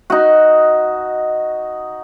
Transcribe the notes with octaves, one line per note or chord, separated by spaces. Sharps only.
D#4 F#4